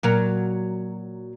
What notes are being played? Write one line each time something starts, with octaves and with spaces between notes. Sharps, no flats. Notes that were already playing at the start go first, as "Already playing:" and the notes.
A#2 F#3 A#4